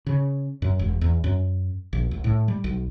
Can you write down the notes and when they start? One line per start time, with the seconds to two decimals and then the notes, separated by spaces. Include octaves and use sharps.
0.06 C#3
0.62 F#2
0.79 E1
1.01 E2
1.24 F#2
1.93 A#1
2.11 C2
2.24 A2
2.48 G3
2.64 B1